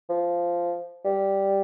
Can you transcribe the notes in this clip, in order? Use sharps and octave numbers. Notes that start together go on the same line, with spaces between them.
F3
G3